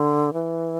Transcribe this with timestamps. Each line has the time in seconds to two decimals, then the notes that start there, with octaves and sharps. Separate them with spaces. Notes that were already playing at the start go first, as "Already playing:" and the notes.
Already playing: D3
0.33 E3